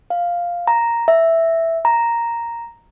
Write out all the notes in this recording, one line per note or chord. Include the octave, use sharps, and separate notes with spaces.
F5
A#5
E5
A#5